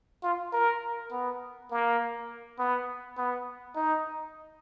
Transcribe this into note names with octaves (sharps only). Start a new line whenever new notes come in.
F4
A#4
B3
A#3
B3
B3
D#4